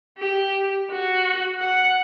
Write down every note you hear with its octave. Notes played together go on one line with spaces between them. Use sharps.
G4
F#4
F#5